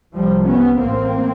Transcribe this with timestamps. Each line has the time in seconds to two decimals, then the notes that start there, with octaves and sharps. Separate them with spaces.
0.14 C2 C3 F3 G3
0.47 B3 C#4
0.79 A1 A2 A#3 C4